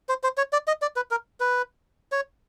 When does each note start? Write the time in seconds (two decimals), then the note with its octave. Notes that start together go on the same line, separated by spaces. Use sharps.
0.09 C5
0.23 C5
0.37 C#5
0.53 D5
0.67 D#5
0.82 D5
0.96 B4
1.11 A#4
1.40 B4
2.12 C#5